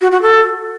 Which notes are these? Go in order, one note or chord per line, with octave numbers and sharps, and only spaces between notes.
F#4
F#4
A4